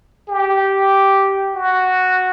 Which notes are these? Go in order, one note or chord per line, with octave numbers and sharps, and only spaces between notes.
G4
F#4